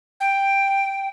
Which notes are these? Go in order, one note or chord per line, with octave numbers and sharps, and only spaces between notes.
G5